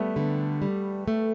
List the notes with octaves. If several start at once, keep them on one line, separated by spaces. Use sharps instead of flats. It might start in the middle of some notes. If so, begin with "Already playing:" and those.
Already playing: G3 A3 B3
D3 B3
G3
A3